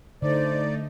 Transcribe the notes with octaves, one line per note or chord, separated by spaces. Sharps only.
D3 A3 D#4 C5 D5